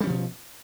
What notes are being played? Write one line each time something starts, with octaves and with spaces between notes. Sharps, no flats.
B2 F3 G3 C#4